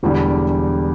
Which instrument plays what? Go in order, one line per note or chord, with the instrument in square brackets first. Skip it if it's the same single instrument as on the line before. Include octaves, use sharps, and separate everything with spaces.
[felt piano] E1 E2 D3 G3